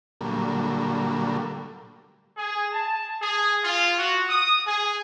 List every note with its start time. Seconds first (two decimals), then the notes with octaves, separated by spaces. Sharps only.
0.21 A#2 D3 F#3 G3 A3 A#3
2.37 G#4
2.73 A5
3.22 G#4
3.64 F4
3.99 F#4
4.29 D#6
4.66 G#4